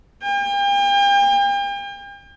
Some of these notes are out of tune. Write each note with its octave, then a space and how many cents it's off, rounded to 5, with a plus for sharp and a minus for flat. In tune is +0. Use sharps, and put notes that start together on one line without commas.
G5 +40